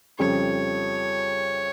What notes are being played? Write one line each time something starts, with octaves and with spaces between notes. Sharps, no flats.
F2 C#3 G3 C#5